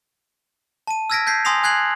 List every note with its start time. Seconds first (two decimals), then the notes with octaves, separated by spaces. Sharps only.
0.87 A5 D#7
1.10 E6 F6 G#6 A#6 B6 D7
1.26 A5 G6 G#6 B6 C7
1.45 G#5 C6 D#6 A#6 C7 F7
1.63 G#5 F#6 G#6 C7 F#7